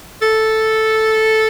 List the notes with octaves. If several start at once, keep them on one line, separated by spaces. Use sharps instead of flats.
A4